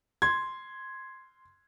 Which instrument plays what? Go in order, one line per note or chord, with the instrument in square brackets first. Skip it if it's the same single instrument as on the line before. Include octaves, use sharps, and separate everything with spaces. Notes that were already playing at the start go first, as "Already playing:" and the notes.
[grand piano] C6 G#6